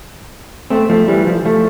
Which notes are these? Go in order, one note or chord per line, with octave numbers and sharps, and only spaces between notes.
A3 C4
F3 A3
E3 G3
F3
F3 A3